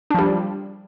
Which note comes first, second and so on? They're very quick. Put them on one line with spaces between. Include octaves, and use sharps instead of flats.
D4 F3 G3